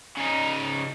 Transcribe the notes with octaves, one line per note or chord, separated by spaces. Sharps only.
C#3 D#4